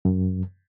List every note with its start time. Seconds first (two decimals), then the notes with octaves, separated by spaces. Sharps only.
0.05 F#2